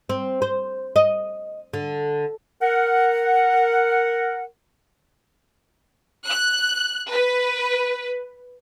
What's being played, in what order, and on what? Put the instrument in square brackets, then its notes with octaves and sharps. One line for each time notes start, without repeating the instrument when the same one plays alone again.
[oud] C4
C5
D#5
D3
[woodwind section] A#4 F#5
[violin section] F#6
B4